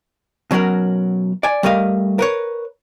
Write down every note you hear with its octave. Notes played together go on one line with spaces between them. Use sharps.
B2 F#3 C#4 F#4 A#4
D5 G#5
G3 A3 A#4 D#5 F5
A#4 B4 C#5